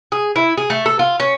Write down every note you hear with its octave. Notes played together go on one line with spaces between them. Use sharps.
G#4
E4
G#4
A3
A4
F4
C#4